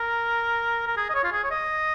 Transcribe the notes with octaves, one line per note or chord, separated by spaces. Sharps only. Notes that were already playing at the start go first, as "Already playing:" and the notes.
Already playing: A#4
A#4
G#4
D#5
C#5
F4
G#4
C#5
D#5